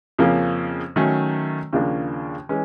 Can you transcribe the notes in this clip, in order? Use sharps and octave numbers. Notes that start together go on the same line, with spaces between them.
F2 C#3 F3 A#3 C#4
D#3 F#3 A3 C#4
D#2 C#3 F3 A#3 D4
E3 G#3 C#4